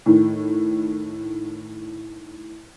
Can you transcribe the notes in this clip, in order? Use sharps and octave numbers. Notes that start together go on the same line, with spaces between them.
A2 D#3